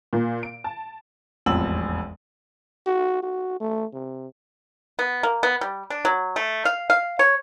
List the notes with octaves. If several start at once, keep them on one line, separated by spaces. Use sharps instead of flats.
A#2
D7
A5
E1 A1 F2 E6 F#7
F#4
F#4
A3
C3
B3
A#3
B3
G3
D4
F#3
A3
F5
F5
C#5